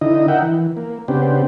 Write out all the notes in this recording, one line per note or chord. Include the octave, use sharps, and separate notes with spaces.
D3 D#4 E4 D#5
A#4 E5 F#5 G5
E3
A#3
C#3 B3 C4 D4 G4